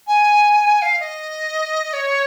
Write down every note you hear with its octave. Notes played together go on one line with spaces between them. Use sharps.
G#5
F5
D#5
C#5